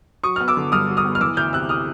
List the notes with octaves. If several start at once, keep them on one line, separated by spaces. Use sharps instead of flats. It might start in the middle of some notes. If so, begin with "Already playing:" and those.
F#3 C#6 D#6
B3 F6
D6 E6
D3
G2 D#6 F6
F#3
D#6 F6
B3
F6
E3 D6 E6
D2 F6 G6
C3 E6 F#6
D#6 F6